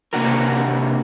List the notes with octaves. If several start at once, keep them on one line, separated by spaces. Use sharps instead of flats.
C3 A#3 D4 F#4 G4 A#4